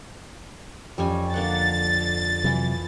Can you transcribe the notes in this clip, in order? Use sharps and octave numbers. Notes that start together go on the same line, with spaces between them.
F2 G3 C#4 G#5
D3 A#3 F#5 A6
C3 E3 F#3 E4